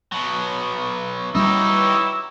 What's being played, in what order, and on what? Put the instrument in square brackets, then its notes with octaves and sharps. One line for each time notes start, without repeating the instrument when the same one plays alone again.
[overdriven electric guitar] B2 F#3
[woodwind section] F#3 B4 C#6 [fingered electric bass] G3 C#4 [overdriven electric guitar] D#4 G4 [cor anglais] E4